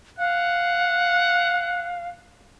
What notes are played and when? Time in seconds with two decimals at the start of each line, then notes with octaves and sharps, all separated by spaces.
0.19 F5 F#5